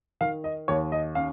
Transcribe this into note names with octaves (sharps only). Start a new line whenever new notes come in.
D#3 F5
D#5
D#2 C#5
D#5
C#4 F5